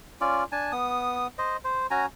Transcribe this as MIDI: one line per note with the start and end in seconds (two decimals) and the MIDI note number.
0.21 0.44 61
0.21 0.44 65
0.21 0.44 74
0.52 0.72 62
0.52 0.72 80
0.52 0.72 81
0.72 1.27 59
0.72 1.27 87
1.38 1.57 72
1.38 1.57 75
1.64 1.87 72
1.91 2.06 61
1.91 2.06 66
1.91 2.06 80
1.91 2.06 82